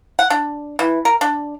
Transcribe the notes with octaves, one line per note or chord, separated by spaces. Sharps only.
F#5
D4
E3
A#4
D4